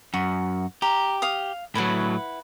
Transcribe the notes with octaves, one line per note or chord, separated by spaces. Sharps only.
F#2 F#4
G4 A#5
F5 D#6
A2 F#3 E4 B4 F#5